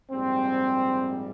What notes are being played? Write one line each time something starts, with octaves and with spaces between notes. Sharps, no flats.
A#1 G#2 G3 C4